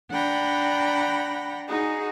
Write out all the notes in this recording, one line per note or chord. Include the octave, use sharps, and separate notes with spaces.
D4 F#5 G5 A#5 B5
D#4 F#4 G#4